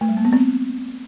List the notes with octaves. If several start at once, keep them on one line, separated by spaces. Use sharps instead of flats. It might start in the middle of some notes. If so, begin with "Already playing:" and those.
A3
G3
A#3
B3
C4